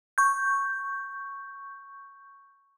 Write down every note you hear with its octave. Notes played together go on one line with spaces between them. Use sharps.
C#6 G6